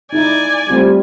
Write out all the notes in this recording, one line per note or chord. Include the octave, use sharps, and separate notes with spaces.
D#4 E4 D5 G#5
G3 A3 C4 F4